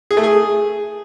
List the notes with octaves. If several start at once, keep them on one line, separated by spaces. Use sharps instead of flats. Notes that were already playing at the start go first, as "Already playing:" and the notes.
G#4
A3
G#4